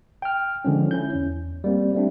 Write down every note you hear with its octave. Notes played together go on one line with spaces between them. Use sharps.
G5 F6
D3 F3 G#3 C#4
C#4 E4 G6
E2
G3 A#3 C4
G3 A3 C4 D4